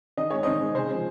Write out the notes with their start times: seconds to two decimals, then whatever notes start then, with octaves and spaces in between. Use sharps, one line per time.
0.17 D#3 D#5
0.30 G#3 C#5
0.43 D#3 C5 D#5
0.61 G#3
0.75 C#3 G#4 C5
0.89 F3 G#3